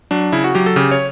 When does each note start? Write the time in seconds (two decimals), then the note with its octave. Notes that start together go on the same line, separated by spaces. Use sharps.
0.11 F#3 D4
0.32 C#3 E4
0.44 F#4
0.55 F#3 G4
0.66 A4
0.76 C#3 G4
0.91 C#5